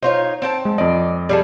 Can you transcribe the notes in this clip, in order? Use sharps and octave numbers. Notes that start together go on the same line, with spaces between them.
D#4 F4 C5 C#5
C4 G5 A5
G#3
F2 D5 D#5
G3 G#4 A4